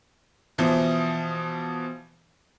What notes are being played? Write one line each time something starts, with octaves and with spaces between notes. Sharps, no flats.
B2 E3 F3